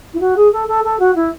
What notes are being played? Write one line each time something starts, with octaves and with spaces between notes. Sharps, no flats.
E4
F#4
G#4
A4
A4
A4
F#4
E4